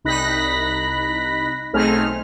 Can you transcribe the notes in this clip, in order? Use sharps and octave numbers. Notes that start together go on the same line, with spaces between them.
C2 D#4 B5 F#6 A#6 B6
B1 A3 C4 D#4 G#4 F6